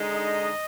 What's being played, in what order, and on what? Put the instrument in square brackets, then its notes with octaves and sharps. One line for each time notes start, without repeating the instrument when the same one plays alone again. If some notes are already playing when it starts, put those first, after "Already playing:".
Already playing: [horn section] D3 G#3 D#4
[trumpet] D#5